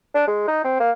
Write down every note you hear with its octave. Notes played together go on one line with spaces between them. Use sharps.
D4
G#3
D#4
C4
A#3